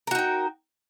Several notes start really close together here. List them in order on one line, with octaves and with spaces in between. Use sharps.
A#4 F#4 D#4 G5